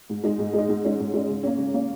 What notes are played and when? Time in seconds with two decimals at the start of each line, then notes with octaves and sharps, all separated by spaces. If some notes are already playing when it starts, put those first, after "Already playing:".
0.10 G#2
0.24 G#3 D#4
0.39 G#2
0.54 G#3 D#4
0.69 G#2
0.84 G#3 C#4
0.99 G#2
1.14 G#3 C#4
1.29 C#3
1.43 A#3 C#4
1.58 C#3
1.74 A#3 C#4